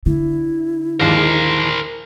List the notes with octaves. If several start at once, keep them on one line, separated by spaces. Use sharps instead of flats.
D3 E4
A#1 D#2 G#3 A#4 C5